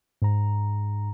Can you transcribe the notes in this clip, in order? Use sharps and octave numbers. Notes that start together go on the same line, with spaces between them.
G#2 A#5